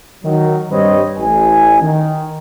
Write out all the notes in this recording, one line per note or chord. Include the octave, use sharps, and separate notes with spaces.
D#3 F#3
G2 G3 C4 B4 C#5 D#5
A1 G#5
D#3